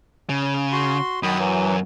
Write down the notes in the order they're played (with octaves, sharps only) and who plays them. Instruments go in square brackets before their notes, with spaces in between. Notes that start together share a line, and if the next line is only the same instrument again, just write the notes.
[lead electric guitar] C#3
[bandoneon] F#4 C6
[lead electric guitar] F#2 [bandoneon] D#3 B5 D#6
[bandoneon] E3 F#3